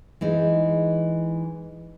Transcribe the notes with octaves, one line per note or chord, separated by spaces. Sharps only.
E3 G#3 D#4